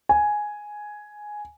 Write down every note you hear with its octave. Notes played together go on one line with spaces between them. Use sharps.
G#5